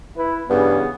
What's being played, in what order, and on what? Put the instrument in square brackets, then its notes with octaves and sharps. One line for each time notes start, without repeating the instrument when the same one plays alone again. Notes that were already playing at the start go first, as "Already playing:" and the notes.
[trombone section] E4 B4
[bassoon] G2 [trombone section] C#3 E3 G#4 [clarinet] B3